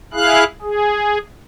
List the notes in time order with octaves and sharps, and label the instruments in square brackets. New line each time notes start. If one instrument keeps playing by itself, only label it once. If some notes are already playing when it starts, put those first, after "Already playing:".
[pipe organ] E4 G#4 F5 F#6
G#4